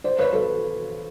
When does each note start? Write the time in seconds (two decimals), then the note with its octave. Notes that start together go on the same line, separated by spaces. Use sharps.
0.04 C5 D5
0.19 B4 C#5
0.33 A4 B4